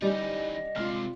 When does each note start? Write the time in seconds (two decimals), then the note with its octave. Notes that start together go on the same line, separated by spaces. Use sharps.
0.02 E3 G3 C#4 D#4 D#5
0.76 C3 G#3 F4 F6